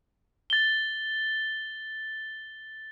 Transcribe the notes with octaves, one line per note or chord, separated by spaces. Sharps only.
A6 G7